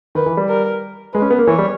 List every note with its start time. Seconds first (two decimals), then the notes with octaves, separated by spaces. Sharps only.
0.15 D#3 B4
0.26 E3
0.37 G3
0.49 A#4
1.13 G#3 B4
1.22 C#4
1.30 B3
1.39 A#3
1.47 E3 C#5
1.58 G3